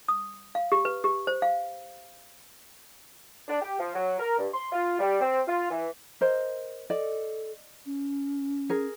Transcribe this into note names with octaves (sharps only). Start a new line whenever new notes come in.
D#6
F5
G4
B4
G4
C5
F5
D4
G4
F3
F#3
A#4
G2
C6
F4
G3
C4
F4
E3
A#4 C5 D#5
A4 D5 D#5
C#4
G#4 A#4